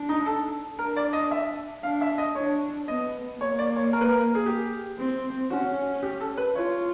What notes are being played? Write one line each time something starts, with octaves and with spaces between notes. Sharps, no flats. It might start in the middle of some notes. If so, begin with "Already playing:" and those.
Already playing: D4
D#4
A4
D4 A#4
D5
D#5
E5
D4 F5
E5
D#5
D4 C#5
B3 D#5
A#3 C#5
D5
C#5
A#4
B4
A#4
G#4
G4
C4
C#4 F#4
G4
A4
B4
F4 C#5